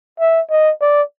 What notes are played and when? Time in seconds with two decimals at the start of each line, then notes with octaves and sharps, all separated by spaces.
0.20 E5
0.50 D#5
0.81 D5